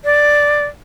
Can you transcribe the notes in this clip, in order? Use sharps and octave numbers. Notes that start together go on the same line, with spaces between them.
D5